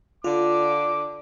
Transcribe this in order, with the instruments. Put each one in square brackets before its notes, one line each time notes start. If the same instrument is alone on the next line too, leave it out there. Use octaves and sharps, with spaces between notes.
[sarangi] D3 [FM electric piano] F4 [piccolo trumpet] D6